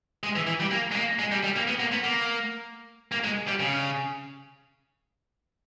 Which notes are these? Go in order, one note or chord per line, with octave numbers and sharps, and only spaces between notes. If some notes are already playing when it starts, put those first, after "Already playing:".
G#3
E3
E3
G3
A#3
G#3
A#3
G#3
G3
G3
A#3
B3
A#3
B3
A#3
A#3
G#3
G3
C#3